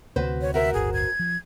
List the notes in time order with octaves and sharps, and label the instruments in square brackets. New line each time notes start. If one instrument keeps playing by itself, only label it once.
[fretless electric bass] D2 C3 [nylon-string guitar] F#4 B4 C5
[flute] C#5
[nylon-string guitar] F#4 A#4 C5 [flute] E5
[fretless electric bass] D1 G1 [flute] G#4
[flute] G#6
[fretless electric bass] F3